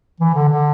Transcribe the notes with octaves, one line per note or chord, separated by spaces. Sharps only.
E3
D3
D3